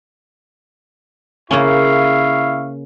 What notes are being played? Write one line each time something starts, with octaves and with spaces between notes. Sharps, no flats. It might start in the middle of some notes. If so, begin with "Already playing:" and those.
C#3 A#3 C#4 E4 F5 C#6